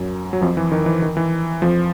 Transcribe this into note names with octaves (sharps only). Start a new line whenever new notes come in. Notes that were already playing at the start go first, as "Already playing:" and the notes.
Already playing: F#2 F#3
F#3
F2 F3
E3
D#3
E3
D#3
E3
F2 F3